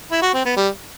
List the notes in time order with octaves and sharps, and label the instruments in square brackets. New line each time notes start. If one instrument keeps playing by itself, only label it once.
[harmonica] E4
F#4
C4
B3
G3